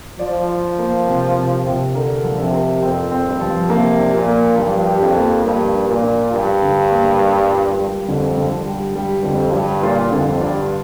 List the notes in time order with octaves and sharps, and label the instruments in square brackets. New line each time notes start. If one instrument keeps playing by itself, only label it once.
[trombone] F3 [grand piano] D5
[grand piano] F4
A#3
C3
C3
C3
[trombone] D3 [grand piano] A#4
[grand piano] F3
[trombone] C3
[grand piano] A#4
[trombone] F2 [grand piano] C4
[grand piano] C4
[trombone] G2
[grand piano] F3
[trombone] C3 [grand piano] A#3
[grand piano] D4
[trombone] A#2
[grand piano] A#3
[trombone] G2 [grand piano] F3
[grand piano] G4
[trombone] F2
[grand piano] A#3
[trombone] G2 [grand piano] A#3
[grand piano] D4
[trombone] A#2
[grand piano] D4
[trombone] G2 [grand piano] D4
[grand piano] D3
A#3
G3
F4
G3
[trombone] F2 [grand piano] D3
[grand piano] D3
G3
[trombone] G2 [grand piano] G3
[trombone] F2 [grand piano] D3
[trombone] G2 [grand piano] G3
[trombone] A#2 [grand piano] F4
[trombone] F2 [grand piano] D3
[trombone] G2 [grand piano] D4